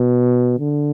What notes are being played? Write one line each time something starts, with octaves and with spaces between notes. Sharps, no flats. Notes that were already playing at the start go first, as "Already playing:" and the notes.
Already playing: B2
D3